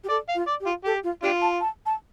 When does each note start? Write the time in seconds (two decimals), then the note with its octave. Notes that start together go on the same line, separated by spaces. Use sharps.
0.04 G4
0.10 A4 D5
0.29 F5
0.35 F4
0.48 D5
0.61 G4
0.67 F4
0.85 G4 A4
1.04 F4
1.23 D4 F4 G4
1.42 A5
1.61 A5
1.86 A5